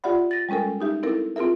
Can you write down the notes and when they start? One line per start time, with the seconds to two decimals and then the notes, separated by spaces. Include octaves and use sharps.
0.04 F4 G4 D5 E5 F#5 B5
0.31 A6 A#6
0.49 G3 G#3 C#4 A4 A#4
0.81 D#4 G4 E5
1.03 C4 E4 A4 A#4
1.36 C4 F4 G#4 A#4 E5